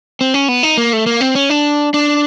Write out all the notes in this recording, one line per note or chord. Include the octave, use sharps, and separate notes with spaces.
C4
C#4
B3
D#4
A#3
A3
A#3
C4
C#4
D4
D4